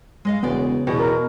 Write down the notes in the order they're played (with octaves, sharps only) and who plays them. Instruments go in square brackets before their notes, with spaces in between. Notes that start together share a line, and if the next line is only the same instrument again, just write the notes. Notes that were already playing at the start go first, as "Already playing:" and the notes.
[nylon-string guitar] G#3 D#5 F5
[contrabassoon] E1 [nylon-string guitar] C#3 D5 [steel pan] B3
[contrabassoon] E2 [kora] B2
[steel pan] A#4